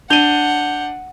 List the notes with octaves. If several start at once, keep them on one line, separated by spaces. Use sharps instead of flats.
D4 F#5 G6 D#7 F7 G7